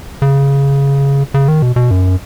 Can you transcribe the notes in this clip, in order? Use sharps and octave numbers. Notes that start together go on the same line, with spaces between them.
C#3
C#3
D#3
B2
B2
F#2